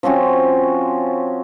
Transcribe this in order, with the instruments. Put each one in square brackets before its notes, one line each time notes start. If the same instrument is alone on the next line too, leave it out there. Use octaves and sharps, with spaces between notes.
[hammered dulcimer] F3 C4 C#4 F#4